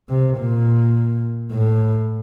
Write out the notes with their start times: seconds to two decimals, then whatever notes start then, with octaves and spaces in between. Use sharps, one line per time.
0.09 C3
0.38 A#2
1.53 A2